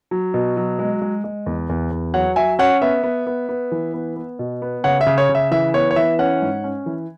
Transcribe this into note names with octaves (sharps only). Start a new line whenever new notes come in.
F#3
B2
F#3
G#3
G#3
G#3
E2
E2
E2
F#3 C#5 F#5
F#3 E5 G#5
C#4 C#5 F#5
B3 E5
B3
B3
B3
E3
B3
B3
B2
B3
C#3 C#5 F#5
E5
C#3
C#5
C#3
E5
E3 E5
B3 C#5
C#5
E3 E5
C#4 C#5 F#5
G#2
C#4
E3